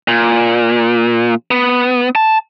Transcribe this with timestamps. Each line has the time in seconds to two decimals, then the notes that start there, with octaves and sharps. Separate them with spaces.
0.08 A#2
1.51 B3
2.15 A5